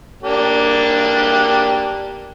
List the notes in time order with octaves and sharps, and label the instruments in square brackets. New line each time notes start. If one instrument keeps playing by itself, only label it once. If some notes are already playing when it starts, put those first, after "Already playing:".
[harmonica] A#3 D4 G4